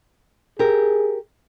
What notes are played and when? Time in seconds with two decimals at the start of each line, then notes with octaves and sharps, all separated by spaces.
0.59 G4 G#4 A#4